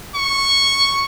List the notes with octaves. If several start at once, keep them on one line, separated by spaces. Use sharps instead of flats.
C#6